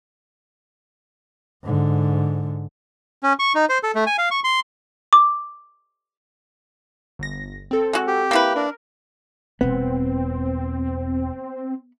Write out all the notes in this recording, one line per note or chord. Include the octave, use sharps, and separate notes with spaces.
G#2 D3
C#4
C#6
D#4
C5
A4
A3
G#5
F5
C#6
C6
D6
G1 A#6
C4 A4
G#3 F#4
G4
A#3 E4 B4
D4 A#4
E1 G3 B3 C4